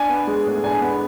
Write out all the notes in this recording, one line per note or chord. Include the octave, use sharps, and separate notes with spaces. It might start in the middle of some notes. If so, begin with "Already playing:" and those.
Already playing: D4 G#5
B3
G#3
A2
D4 G#5
B3